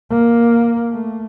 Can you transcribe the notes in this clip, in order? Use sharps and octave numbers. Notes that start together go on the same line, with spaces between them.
A#3
A3